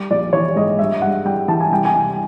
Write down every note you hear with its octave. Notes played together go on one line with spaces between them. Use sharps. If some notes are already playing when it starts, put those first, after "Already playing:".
Already playing: G3
A#1 D5
E3 C#5
G#2 D#5
G2 E5
G2 F#5
G3 G5
E3 A5
G#5
C2 G5
G#5
C2